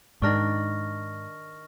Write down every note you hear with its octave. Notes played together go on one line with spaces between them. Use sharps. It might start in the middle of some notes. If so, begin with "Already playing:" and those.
G#2 D#3 D4 D5 C#6 F6 A#6